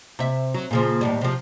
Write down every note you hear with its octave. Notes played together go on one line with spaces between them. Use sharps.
C3 E5
F#3
A#2 C#3 F3
D#2 A2 G3
C3 F3